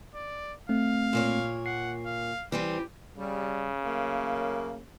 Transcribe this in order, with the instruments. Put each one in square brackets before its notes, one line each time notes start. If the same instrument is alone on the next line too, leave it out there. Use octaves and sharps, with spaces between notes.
[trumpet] D5
[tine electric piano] A3 C4 [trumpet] F5
[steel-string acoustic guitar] A#2 A#3 C#5
[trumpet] F#5 [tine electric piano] C7
[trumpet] F5
[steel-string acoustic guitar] E3 G3 C4 [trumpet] G4
[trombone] C#3 [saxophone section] G3
[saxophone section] F#3 A3 A#3